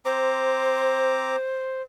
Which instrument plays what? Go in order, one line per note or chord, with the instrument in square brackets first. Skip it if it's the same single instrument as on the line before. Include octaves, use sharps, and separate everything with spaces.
[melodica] C4 A#5 D6 [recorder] C5